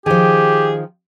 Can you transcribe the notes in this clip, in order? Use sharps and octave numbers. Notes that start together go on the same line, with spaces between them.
D#3 F3 G4 G#4